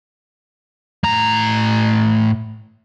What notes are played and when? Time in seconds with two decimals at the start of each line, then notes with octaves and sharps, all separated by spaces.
1.04 A2 A#5